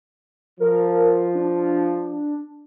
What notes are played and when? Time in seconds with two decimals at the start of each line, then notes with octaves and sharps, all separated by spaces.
0.60 F3 A#4
1.35 D4